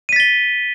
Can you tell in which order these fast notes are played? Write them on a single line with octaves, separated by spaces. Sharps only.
D#7 B6 A6 G7